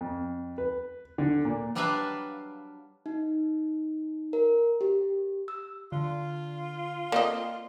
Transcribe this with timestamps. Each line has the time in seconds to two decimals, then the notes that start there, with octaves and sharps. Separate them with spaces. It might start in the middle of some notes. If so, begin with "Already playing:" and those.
0.01 F2
0.58 B4
1.18 D3
1.45 A#2
1.75 F#3 G3 D4 B4 E5 F5
3.06 D#4
4.33 A#4
4.81 G4
5.48 E6
5.92 D3 F4
7.12 A#3 C4 D5 D#5